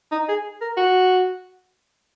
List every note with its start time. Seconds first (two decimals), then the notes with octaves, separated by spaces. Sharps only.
0.12 D#4
0.29 G#4
0.61 A#4
0.77 F#4